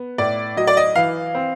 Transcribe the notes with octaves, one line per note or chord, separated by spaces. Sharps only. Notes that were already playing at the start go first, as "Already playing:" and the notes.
Already playing: B3
A2 D5
F#3 D#5
D5
D#5
E3 F5
C4